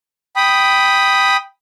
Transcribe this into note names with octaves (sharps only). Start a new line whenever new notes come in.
G5 B5 D#6